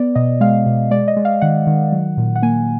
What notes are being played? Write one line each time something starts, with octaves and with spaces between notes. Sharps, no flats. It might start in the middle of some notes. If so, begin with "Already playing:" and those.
Already playing: B3 D5
B2 D#5
G#3 F5
B2
G#3 D5
D#5
G#3
F5
D#3 F#5
D#3
F#3
A#2
F#5
A#3 G#5